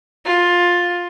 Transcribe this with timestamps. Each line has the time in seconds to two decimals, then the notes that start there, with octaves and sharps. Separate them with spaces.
0.25 F4